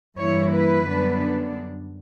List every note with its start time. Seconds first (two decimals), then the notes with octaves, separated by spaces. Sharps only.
0.18 G2 E3 A#3 E4 C#5
0.53 B4
0.87 F#2 D3 G3 B3 D4